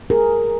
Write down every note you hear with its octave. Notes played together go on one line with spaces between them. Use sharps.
G#4 A#4